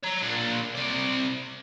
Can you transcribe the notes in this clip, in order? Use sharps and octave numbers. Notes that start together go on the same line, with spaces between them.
C#5 A#5
A#2 D4
C3 D5